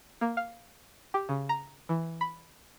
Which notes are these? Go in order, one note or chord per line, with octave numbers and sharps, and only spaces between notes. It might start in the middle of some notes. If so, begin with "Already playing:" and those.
A#3
F5
G4
C#3
A#5
E3
B5